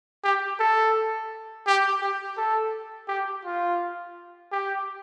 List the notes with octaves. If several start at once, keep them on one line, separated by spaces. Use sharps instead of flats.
G4
A4
G4
G4
A4
G4
F4
G4